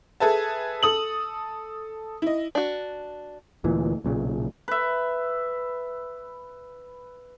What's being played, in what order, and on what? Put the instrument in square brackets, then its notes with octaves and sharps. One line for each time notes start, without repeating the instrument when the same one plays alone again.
[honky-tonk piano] G#4 A4 B4 E5 A5
A4 D#6 F#7
E4 D#5
[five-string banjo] D4 F#4
[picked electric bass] D2 A#2 E3
B1 A#2 C#3
[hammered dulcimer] B4 E5